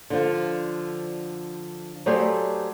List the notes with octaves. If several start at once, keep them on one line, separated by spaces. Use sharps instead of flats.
D3 F3
F#3 A3 G4 G#4 C5 D5